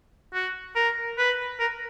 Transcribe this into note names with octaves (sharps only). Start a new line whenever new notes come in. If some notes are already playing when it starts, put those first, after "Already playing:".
F#4
A#4
B4
A#4